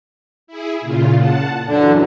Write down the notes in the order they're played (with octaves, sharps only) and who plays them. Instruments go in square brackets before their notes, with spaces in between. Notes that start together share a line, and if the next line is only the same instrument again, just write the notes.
[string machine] E4 G#4
A#2 C#3 F4
F#5 A5
[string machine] F#2 E3 F#3 [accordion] D3